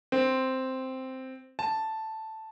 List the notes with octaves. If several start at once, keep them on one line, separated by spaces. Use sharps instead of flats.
C4
A5